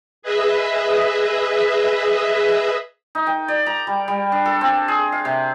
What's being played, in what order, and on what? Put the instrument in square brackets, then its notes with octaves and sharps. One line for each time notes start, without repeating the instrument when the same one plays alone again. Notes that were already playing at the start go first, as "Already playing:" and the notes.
[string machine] G#4 B4 D#5 E5
[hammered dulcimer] D#4
G5
D5
A#5
G3
G3
D4
A4
C4
G#4
F5
C3